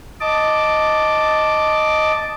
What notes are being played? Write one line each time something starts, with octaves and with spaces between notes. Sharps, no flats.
D#5 A5 D6